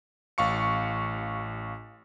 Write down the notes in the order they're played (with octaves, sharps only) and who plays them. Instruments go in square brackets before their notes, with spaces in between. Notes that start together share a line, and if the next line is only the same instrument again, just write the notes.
[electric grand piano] A1 F5 C#6 C#7